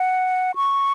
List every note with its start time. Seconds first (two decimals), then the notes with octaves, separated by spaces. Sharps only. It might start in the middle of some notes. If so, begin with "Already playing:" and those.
Already playing: F#5
0.55 C#6